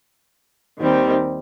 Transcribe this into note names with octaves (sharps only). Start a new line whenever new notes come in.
D#2 D#3 G3 C4